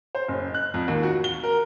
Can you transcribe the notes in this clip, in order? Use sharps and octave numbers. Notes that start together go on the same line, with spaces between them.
C5
F#1
F#6
F2
D#2
F#4
G7
A#4